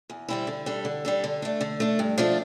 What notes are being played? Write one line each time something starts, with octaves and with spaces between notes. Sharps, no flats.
E2
D3 G3 C4 E4
D3
G3 D4 A4
D3
G3 D4 A4
D3
A3 D4
D3
A3 D4
G2
F3 A3 D4